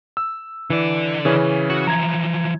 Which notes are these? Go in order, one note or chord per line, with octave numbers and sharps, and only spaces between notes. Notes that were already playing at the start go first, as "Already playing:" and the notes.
E6
D3 E3 D5
C#3 E3 C#4
F#4
E3 F3 A#5 G#6